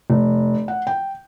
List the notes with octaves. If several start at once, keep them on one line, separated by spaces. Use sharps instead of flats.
F1
F#5
G5